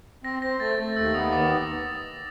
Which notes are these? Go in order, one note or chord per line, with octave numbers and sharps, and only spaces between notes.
C4 A#6
C4 A#6
A3 A6
A3
D#2 E6
B3 D#6
D#3 D6